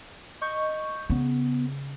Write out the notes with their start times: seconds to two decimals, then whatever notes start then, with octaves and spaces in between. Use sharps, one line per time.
0.41 D#5 C#6 G6
1.10 C#3 B3